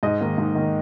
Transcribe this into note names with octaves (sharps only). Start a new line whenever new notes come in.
G#2 D#5
D#3 A#3
G#2
D#3 A#3